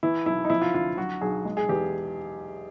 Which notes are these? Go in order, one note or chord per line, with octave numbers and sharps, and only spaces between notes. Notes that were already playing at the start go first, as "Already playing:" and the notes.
E3 E4
B1 E4
D#4
F3 E4
F4
D2 F4
F#3 F#4
B1 G#4
G#3
G#4
E2 G4